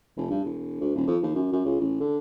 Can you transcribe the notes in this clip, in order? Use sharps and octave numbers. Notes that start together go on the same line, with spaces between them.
F1
G2
E1
D2
D#1
F2
D#2
F#2
F#2
C#2
A1
D3